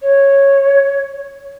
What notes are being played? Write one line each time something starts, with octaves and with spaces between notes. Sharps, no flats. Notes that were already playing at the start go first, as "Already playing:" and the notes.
C#5